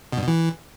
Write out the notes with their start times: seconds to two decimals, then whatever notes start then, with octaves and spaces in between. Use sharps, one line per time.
0.12 B2
0.18 G2
0.23 B2
0.28 E3